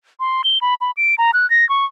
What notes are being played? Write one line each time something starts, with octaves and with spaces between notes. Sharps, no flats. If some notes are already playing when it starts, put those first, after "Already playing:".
C6
G7
B5
B5
D7
A#5
F#6
A#6
C#6